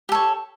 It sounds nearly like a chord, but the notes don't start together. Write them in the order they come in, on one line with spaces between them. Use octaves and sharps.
G4 A4 C#5